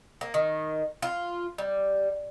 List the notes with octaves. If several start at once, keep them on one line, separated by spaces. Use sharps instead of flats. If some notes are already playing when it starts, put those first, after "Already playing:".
A#3
D#3
F4
G3